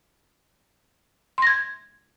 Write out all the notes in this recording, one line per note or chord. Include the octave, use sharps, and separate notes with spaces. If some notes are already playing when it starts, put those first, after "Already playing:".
C6 G#6 A#6